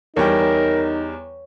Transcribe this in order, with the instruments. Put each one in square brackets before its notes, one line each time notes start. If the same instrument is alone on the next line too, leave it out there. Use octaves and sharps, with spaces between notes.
[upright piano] E2 G3 [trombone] D#4 [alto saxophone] A#4 [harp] C#5 G5